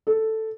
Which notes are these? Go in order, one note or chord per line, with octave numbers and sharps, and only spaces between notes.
A4